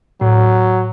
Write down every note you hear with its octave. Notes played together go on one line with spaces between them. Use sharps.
A2 F#3